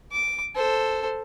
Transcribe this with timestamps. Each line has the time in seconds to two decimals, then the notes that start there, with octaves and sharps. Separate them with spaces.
0.11 D6
0.55 A4 C5